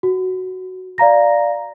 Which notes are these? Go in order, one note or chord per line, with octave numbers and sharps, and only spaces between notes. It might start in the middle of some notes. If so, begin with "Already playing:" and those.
F#4
D5 F5 A#5 A#6